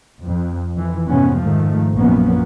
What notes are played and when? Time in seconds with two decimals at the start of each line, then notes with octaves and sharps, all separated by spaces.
0.22 F2
0.75 F2 E3
1.07 F2 G#2 C3 B3 C#4
1.40 G#2 D#3 F3 A3
1.95 A#1 F#2 F3 A#3 B3 C#4